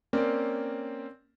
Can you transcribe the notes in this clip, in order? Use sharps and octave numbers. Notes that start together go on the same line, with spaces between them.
A#3 C4 C#4 A#4 D5